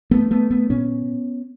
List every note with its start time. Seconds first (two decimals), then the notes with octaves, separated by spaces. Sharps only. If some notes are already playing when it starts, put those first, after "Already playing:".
0.11 A3 B3
0.31 A3 B3
0.50 A3 B3
0.70 A#2 B3 C#4